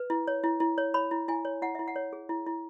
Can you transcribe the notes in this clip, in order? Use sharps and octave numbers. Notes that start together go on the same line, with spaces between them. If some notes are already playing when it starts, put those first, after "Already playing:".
Already playing: B4
E4
C#5
E4
E4
C#5
C#5 B5
E4
E4 G#5
C#5
E4 F#5
E4 E5
F#5
C#5
G#4
E4
E4